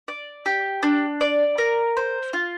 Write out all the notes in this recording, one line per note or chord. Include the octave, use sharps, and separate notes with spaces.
D5
G4
D4
D5
A#4
C5
F4